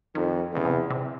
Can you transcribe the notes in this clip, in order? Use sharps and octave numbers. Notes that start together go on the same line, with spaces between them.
F2 D#3
E2 C#3
C3
C3